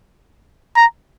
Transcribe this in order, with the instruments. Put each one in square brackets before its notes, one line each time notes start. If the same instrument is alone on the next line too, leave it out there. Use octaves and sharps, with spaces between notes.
[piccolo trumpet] A#5